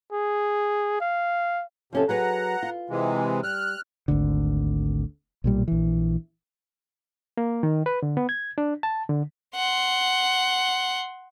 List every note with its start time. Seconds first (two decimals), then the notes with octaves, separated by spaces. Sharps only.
0.12 G#4
1.01 F5
1.93 C3 F3 C#4 A4
2.09 F#3 G#4 B4 F#5 A#5
2.63 F4
2.90 C3 E3 G#3
3.43 G3 F6 F#6
4.08 G#1 D2 D3
5.44 B1 A#2 G3
5.68 A#1 E3
7.37 A#3
7.63 D#3
7.86 B4
8.02 D3
8.17 B3
8.29 G#6
8.58 D4
8.83 A5
9.09 D3
9.55 F#5 C6